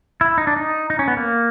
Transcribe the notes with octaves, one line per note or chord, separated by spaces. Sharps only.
E4
D#4
D4
D#4
D#4
C#4
B3
A#3